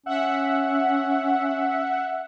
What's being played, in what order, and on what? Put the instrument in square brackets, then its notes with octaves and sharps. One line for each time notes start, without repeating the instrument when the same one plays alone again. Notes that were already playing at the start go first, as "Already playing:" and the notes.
[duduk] C#4 [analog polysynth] E5 F#5